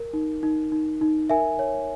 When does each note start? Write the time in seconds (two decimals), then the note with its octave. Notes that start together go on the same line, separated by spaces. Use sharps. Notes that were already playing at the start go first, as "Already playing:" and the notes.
Already playing: A#4
0.13 D#4
0.43 D#4
0.72 D#4
1.01 D#4
1.30 A#4 E5 G#5
1.59 C#5